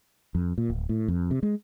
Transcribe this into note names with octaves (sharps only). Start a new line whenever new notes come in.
F2
A#2
D1
A2
F2
C3
G#3